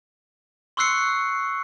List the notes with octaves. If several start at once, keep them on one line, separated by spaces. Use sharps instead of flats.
C6 C#6 E6 F#6 C7 C#7